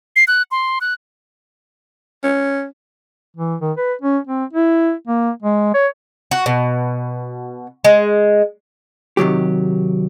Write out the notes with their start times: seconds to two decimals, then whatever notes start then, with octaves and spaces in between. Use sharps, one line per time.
0.16 C7
0.28 F#6
0.51 C6
0.81 F#6
2.24 C#4
3.36 E3
3.61 D#3
3.77 B4
4.01 C#4
4.27 C4
4.53 E4
5.08 A#3
5.42 G#3
5.74 C#5
6.31 F#4
6.46 B2
7.84 G#3
9.17 C3 D#3 F#3 G4